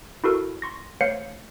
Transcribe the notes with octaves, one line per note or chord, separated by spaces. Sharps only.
E4 F#4 A4 A#4
C6 C#6 A#6
A3 C5 C#5 F5 C#7